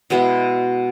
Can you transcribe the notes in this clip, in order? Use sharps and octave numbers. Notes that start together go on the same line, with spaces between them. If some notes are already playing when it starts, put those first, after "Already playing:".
B2 G#3 B3 E4